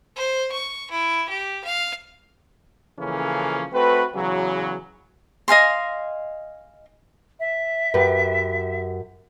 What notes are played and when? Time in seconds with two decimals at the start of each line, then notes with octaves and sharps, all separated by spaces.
0.16 C5
0.52 C#6
0.91 E4
1.29 G4
1.64 F5
2.99 C#3 E3 F3 A#3 C#4 A4
3.73 A3 C4 F#4 B4
4.15 E2 C#3 E3 F#3
5.48 D#5 F5 G#5 C6
7.39 E5
7.94 F#2 G4 B4